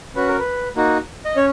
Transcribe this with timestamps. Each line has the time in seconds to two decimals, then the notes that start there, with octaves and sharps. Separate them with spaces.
0.15 C#4 F#4 B4
0.28 A#4
0.39 B4
0.76 A#3 D#4 F#4
1.25 D#5
1.36 C#4 C#5